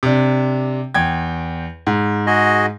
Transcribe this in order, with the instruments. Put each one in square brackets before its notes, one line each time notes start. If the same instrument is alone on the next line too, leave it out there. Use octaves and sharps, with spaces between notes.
[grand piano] C3 D4
E2 G5 G#6
G#2
[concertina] F#4 G#4 D#5